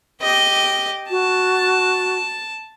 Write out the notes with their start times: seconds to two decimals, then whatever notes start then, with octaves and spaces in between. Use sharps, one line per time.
0.22 G4 D#5
1.10 F#4 A5